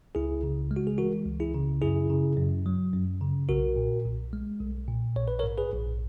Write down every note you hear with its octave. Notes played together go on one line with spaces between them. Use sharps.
C#2 E4 G#4
C#3
G#3
F#4
G#4
E3 F#4 A#4
C#2
E4 G#4
C#3
F#2 E4 G#4
C#3
F#2
F#3
F#2
C#3
B1 F#4 A#4
A#2
B1
G#3
B1
A#2
A#1 C#5
B4
A#4 C#5
G#2
G#4 B4
A#1